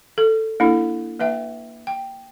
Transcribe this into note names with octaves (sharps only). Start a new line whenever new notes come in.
A4
A#3 D4 E4 A4
A#3 B4 E5 G5
G5